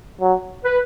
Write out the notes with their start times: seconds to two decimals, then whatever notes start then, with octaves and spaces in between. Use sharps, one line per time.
0.21 F#3
0.64 B4